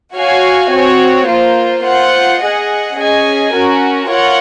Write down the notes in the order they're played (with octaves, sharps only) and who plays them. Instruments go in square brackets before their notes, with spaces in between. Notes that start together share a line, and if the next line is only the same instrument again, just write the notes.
[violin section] F#4 C#5 F5 G#5
C4 F#4 C#5
A#3 F4 C5
F4 C5 F#5
G#4 D#5 F#5
C#4 G#4 D#5 G#5
C#4 F#4 A#4
F4 A#4 C#5 F#5